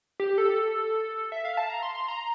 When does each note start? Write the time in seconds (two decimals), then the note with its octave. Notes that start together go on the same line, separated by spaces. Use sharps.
0.20 G4
0.38 A4
1.32 E5
1.45 F5
1.57 A5
1.69 A#5
1.82 C6
1.95 C6
2.08 A#5